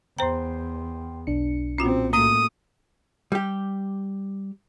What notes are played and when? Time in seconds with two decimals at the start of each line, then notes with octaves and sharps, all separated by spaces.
0.19 E2 C5 G5 A#5 C6
1.27 B1 D4 C#7
1.78 A#1 C4 C#4 F4 F#4
2.13 A2 A3 A#3 D#6
3.32 G3 G4